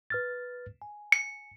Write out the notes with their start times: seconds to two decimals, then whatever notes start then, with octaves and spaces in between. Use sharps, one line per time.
0.10 B4 F6 A6
0.82 G#5
1.12 C#7